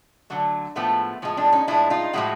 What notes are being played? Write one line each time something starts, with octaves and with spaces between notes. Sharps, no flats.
D3 F#3 A3
A2 F3 G#3 A3 B3
A2 F3 G#3
C4 D4
C#4 D#4
A2 F3 G#3 D4 E4
D#4 F4
A2 F3 G#3 E4 F#4